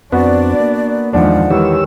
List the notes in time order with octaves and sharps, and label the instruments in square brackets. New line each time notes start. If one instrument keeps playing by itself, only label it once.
[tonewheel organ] F2 C4 [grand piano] B3 F#4 [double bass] D4 [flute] D5
[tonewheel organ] A#3
[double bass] E2 G#3 [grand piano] D#3 F3 D4 [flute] F#5
[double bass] D#3 G#3 [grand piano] E3 [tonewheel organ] G4 C#5 E6